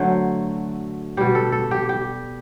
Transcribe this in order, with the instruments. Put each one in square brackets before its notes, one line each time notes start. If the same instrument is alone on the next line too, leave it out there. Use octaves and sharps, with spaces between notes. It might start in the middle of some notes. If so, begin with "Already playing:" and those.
Already playing: [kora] D3 F#3 A3 C5
B2 G3 G4
A4
A4
G4
G4